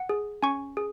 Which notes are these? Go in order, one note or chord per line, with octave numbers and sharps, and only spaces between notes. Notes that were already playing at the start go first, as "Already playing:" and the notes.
Already playing: F#5
G#4
C#4 G#5 C#6
G#4